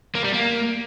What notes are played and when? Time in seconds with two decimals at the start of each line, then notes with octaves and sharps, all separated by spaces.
0.15 A#3
0.24 G3
0.33 A#3